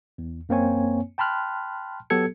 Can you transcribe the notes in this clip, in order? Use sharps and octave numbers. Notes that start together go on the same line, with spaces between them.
E2
F#2 A#3 C4 C#5 G#5
G5 A5 B5 C6 F6 F#6
F#3 B3 G4 A4 G#6 C#7